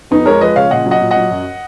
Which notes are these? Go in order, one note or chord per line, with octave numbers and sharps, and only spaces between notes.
F2 B3 D#4
G#3 A#4 C#5
F3 B4 D#5
C#3 C#5 F5
A#2 D#5 F#5
F#3
D#5 F#5
A#2
D#5 F#5
F#3
F#2